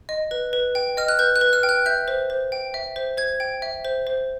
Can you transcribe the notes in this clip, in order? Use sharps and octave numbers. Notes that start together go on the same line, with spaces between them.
D#5
B4
B4
G5
D#5 F6
F#6
B4 G6
F#6
B4
F6
G5
F#6
E5 G6
C5
C5
G5
E5
C5
C5 G#6
G5
E5
C5
C5